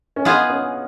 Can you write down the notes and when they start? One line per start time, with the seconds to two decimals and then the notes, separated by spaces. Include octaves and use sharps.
0.16 C#4
0.25 B3 D#4 F4 G#4
0.50 C#4